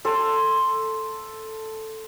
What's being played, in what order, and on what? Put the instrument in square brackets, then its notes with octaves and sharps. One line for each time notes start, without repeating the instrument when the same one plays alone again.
[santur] A4 C6